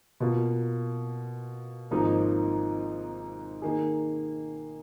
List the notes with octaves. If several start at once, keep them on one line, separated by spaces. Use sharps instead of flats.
B2 A#3 F4
G#1 G#2 F3 A#3 D#4
D#3 A#3 D#4 G#4